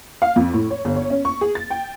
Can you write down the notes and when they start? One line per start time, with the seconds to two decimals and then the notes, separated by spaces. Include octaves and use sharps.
0.22 F5
0.36 F2
0.54 A2
0.70 C#5
0.85 G1
0.96 C#5
1.10 C#4
1.25 C#6
1.41 G#4
1.55 A6
1.70 G5